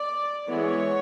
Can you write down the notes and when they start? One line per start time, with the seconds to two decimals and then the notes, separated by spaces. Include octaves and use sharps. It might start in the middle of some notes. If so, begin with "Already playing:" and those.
Already playing: D5
0.47 E3 G#3 B3 C#5